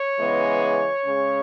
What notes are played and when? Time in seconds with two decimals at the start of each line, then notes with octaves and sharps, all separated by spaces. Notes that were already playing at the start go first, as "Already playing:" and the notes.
Already playing: C#5
0.20 C#3 E3 G#3 B3
1.06 C#3 G#3 C#4